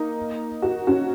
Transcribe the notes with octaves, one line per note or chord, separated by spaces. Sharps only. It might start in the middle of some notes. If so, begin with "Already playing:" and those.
Already playing: A#3 D#4
F#4
C#4 F#4